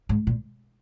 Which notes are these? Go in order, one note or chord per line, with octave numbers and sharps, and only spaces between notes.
G#2
A#2